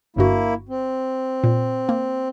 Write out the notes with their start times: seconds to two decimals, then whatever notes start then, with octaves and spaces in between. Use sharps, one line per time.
0.16 G1 G2 A#3 E4 F#4
0.69 C4
1.44 A#2
1.89 A#3